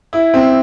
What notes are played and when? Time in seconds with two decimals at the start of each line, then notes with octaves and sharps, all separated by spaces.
0.13 E4
0.34 C4